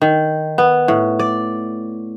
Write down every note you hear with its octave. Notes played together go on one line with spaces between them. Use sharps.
D#3
B3
A2
D5